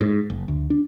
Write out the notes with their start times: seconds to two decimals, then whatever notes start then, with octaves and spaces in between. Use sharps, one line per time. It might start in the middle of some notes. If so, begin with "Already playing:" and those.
0.01 G#2
0.30 F#1
0.48 D2
0.70 D4